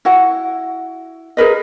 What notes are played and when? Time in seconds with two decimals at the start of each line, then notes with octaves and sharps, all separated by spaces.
0.05 E4 F#4 F#5
1.37 G#4 A#4 B4 D#5